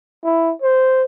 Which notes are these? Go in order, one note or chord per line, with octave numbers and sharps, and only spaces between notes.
E4
C5